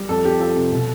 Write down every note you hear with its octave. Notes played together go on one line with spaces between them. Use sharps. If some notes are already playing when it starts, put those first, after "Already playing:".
Already playing: G3
F2 A4
F2 G4
F3 A4
C3
B2